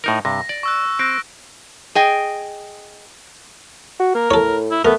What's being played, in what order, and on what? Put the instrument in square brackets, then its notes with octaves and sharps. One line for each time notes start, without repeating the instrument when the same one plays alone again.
[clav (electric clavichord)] A2 D#4 A#4
[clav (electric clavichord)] G2 C3 [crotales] A#6
[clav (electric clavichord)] D5
[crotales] C#6 E6 F#6
[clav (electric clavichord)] C4 [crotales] F#6 A#6 D7
[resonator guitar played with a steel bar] G#4 D#5 G5
[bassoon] F#4
[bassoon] A#3 [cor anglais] A#4
[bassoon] A2 [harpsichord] A4 C#5
[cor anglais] E4
[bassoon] A3 [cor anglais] B3 [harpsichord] A#4